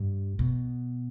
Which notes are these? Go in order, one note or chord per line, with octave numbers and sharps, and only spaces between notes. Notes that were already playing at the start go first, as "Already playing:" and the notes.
Already playing: G2
B2